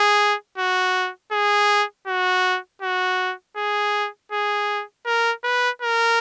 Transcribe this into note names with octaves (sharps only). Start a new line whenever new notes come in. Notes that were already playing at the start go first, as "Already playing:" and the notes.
Already playing: G#4
F#4
G#4
F#4
F#4
G#4
G#4
A#4
B4
A#4